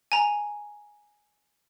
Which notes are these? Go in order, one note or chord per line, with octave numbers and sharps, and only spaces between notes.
G#5 A#5